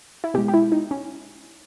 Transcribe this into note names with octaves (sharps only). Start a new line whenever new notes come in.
E4
B2 G#3 G4
G4
E4
D#4
C#4